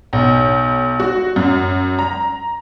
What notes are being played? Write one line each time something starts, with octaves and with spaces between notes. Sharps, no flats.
B1
F#4
F#2
A#5